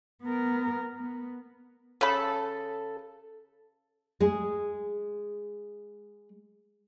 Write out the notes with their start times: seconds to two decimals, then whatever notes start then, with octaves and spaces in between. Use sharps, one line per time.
0.23 B3 A#4
0.98 B3
2.01 C#3 A4 B5
4.20 G#3 G#4